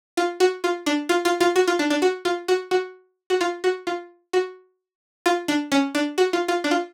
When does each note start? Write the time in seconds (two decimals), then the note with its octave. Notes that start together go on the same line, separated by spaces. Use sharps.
0.17 F4
0.40 F#4
0.64 F4
0.86 D4
1.09 F4
1.25 F4
1.41 F4
1.56 F#4
1.67 F4
1.79 D4
1.90 D4
2.02 F#4
2.25 F4
2.48 F#4
2.71 F#4
3.30 F#4
3.41 F4
3.64 F#4
3.87 F4
4.33 F#4
5.26 F4
5.48 D4
5.72 C#4
5.95 D4
6.18 F#4
6.33 F4
6.48 F4
6.64 D4
6.71 F4